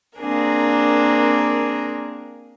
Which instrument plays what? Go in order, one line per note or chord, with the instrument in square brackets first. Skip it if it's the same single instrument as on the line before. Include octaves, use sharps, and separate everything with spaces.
[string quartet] A#3 C4 D4 G#4 A#4